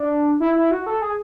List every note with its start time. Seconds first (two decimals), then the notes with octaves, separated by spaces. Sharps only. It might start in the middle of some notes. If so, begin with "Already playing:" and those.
Already playing: D4
0.40 E4
0.55 E4
0.71 F#4
0.86 A4
1.01 G#4